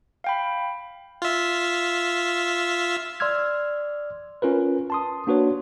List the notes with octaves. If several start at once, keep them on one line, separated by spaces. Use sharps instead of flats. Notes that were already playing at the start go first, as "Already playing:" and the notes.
F5 G5 B5
F4 E5
D5 C6 E6 F6 G#6
C#4 F4 A#4 B4
A5 C6 D#6
A#3 D4 F#4 B4 C#5